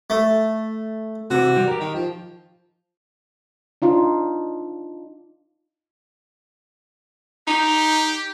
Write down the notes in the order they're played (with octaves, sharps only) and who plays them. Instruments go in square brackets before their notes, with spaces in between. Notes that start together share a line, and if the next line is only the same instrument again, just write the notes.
[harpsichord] A3
[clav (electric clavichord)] C3 E3 [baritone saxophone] F#4
[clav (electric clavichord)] G3
G4 A#4
[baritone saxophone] D#3
F3
[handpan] D4 D#4 F4
[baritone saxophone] D#4 [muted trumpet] G4